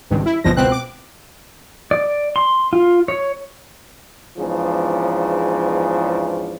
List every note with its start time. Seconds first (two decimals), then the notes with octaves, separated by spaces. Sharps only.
0.10 G#1 C#2 G2
0.26 E4
0.44 G1 E2 B2 F3 A#6
0.56 C#2 B2 C4 F#6
0.72 D6
1.91 D5
2.36 C6
2.73 F4
3.08 C#5
4.37 E2 G#2 C#3 F3 B3 D4